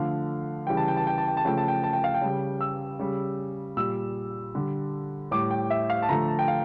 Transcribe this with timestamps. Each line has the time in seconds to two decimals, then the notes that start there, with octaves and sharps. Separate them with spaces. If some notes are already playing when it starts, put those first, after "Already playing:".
Already playing: D3 F3 A3 F5
0.67 C#3 E3 G3 G5
0.77 A5
0.88 G5
0.97 A5
1.07 G5
1.18 A5
1.28 G5
1.37 A5
1.45 C#3 F3 A3 G5
1.58 A5
1.68 G5
1.83 A5
1.93 G5
2.04 F5
2.14 G5
2.22 C#3 G3
2.61 E6
2.99 C#3 G3
3.77 A#2 G3 E6
4.55 D3 G3
5.31 A2 G3 D6
5.51 G5
5.70 E5
5.90 F5
6.02 A5
6.09 D3 F3 A3 A#5
6.28 A5
6.39 G5
6.48 F5